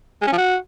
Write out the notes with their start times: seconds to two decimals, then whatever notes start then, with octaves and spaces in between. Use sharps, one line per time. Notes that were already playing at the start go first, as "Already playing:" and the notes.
0.22 G#3
0.27 C#4
0.32 F3
0.38 F#4